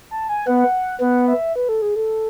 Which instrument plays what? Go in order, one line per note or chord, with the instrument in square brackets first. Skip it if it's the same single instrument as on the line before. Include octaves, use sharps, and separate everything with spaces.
[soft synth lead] A5
G#5
[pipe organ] B3 [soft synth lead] F#5
[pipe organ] B3 [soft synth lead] F#5
[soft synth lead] E5
B4
A4
G#4
A4